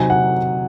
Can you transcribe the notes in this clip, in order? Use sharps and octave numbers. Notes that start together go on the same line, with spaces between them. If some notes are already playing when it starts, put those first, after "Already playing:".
Already playing: C3 F#3 C4 D#4 G#5
F#5